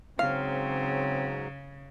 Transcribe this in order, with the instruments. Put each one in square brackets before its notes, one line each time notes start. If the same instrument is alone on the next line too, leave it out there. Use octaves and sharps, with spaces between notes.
[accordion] G#2 F#3 [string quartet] C#3 [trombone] C4 [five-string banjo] F5